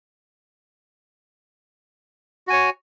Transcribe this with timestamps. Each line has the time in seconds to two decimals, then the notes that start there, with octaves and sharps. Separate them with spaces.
2.47 F#4
2.50 G#5
2.53 C#5